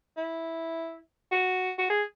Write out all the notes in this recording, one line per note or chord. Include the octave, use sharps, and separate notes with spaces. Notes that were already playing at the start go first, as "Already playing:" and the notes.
E4
F#4
F#4
G#4